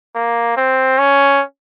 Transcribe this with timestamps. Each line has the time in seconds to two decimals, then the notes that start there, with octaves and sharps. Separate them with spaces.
0.16 A#3
0.57 C4
0.99 C#4